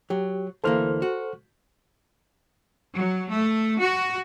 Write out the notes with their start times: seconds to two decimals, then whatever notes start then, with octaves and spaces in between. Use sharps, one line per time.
0.10 F#3 G4
0.64 D2 E3 A#3 A4 C5 F6
1.02 F#4
2.97 F#3
3.32 A3
3.80 F#4